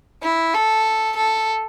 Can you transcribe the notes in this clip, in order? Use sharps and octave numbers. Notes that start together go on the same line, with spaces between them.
E4
A4
A4